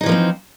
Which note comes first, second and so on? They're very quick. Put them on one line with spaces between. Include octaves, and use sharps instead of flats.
D#4 E3 F3 A#3 C4